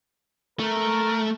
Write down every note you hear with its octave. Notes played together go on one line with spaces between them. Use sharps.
A3 A#4